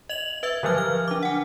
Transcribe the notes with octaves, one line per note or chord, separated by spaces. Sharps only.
D#5 F7 F#7
B4 E5 E6 G#6
D3 F3 F#3 F6
F6
D4 D6
F#5 G#5